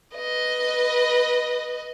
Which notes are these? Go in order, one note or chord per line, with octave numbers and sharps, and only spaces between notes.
B4 D#5